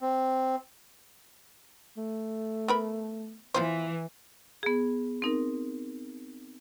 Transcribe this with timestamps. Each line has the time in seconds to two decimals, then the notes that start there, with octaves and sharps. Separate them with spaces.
0.01 C4
1.97 A3
2.68 B3 A#4 B5
3.54 E3 B3 F4 C5
4.63 B3 G#4
5.22 C4 D#4 A#4